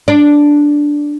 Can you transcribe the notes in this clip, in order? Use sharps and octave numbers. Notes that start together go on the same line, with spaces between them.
D4